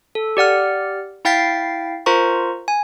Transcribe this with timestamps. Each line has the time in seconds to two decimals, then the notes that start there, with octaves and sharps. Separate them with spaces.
0.15 A4
0.37 G4 D5 F#5 F6
1.25 E4 F5 G5 A6 B6 C7
2.06 F4 A#4 C5 A#5 C#6
2.68 G#5